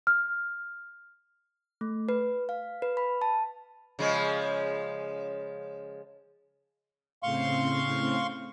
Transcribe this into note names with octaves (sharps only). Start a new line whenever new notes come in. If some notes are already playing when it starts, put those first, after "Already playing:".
F6
A3
B4
F5
B4
B5
A5
C#3 F3 G#3
A2 C#3 C4 F5 C6 C#6